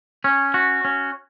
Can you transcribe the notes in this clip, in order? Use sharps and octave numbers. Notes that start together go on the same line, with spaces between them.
C#4
F#4
C#4